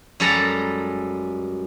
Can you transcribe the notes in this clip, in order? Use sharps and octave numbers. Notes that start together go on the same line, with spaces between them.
F#2 G3 G#3 A4 A#5